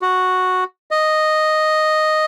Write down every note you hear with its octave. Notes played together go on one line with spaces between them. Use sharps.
F#4
D#5